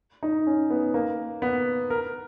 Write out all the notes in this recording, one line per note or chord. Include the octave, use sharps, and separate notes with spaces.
D#4
C#4
B3
A#3
B3
A#4